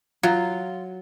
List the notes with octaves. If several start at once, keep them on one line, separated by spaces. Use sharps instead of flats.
F#3 F4